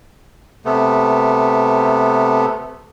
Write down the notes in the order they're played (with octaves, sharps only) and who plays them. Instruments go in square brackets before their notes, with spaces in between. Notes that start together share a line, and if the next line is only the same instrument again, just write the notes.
[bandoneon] C3 A3 B3